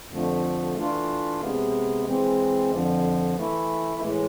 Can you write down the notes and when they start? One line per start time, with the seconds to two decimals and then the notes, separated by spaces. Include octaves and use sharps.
0.11 F2 D3 F3 A3
0.76 E3 A3 D4 F4
1.40 C3 G#3 B3
2.06 E3 G#3 C4
2.71 F2 D3 F3
3.35 E3 A3 E4
4.01 A2 E3 G#3